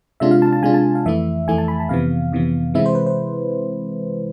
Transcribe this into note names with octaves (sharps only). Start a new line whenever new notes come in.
C3 G#3 D4 F4 E5
F5
A5
A5
C3 G#3 D4 F4 G#5
A5
F5
F2 E3 A3 E4 E5
F2 E3 A3 E4 G#5
A5
B5
A5
F2 C3 E3 B3 F5
F2 C3 E3 B3
C3 E3 G#3 C4 E4 E5
C5
B4
C5